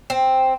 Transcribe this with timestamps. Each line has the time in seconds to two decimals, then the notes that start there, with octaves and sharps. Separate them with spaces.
0.10 C4